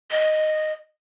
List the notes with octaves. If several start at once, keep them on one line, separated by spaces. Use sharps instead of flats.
D#5